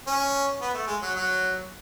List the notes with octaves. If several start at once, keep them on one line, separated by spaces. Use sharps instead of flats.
C#4
B3
A3
G#3
F#3
F#3